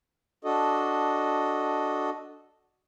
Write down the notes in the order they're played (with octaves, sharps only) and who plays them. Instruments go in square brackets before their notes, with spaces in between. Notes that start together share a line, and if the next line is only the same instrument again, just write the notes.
[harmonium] D4 F#4 A4 D#5